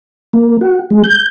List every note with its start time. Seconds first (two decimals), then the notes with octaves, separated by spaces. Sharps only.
0.33 A#3
0.61 F#4
0.90 G#3
1.04 G6